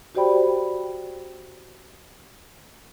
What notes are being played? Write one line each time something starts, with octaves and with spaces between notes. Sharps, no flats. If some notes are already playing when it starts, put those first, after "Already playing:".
F#4 G4 C5 D5 G5 B5